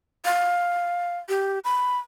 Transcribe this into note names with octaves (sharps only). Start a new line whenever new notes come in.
F5
G4
B5